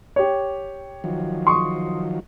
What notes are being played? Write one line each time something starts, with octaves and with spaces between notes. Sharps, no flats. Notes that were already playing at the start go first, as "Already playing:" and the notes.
G4 C#5
D#3 F3 F#3
C6 C#6 D#6